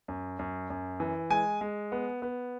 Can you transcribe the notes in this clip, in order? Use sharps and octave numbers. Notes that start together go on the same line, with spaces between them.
F#2
F#2
F#2
E3
G#3 G#5
G#3
B3
B3